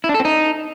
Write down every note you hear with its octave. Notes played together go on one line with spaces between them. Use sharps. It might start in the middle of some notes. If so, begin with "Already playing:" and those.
E4
D4
A4
C4
D#4